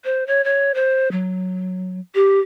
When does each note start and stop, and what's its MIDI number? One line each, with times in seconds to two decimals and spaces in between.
0.04 0.26 72
0.27 0.44 73
0.44 0.72 73
0.74 1.08 72
1.12 2.00 54
2.15 2.40 67